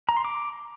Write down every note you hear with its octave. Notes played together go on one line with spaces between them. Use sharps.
A#5
C6
D6